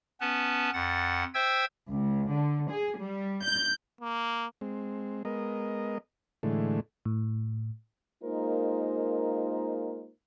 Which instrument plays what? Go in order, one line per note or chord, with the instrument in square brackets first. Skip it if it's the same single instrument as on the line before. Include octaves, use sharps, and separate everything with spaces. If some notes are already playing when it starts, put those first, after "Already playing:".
[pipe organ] B3 C#4 B4 A5
F2 F#5 A6
C5 E5 G5 E6 G#6
[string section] C#2
D3
G#4
G3
G6
[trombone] A#3
[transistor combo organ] G#3 C4
G#3 B3 A#4 D#5
A2 D3 E3 G#3 A3
[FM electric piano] A2
[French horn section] G#3 A#3 D#4 F4 A#4 C5